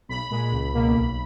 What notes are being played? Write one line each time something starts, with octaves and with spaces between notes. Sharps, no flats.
B1 B5
A#2 G#3 B5
C#2
B2 A#3
B1